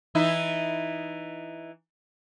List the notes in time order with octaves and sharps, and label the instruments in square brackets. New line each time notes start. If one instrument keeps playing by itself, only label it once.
[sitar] E3 D#4 E4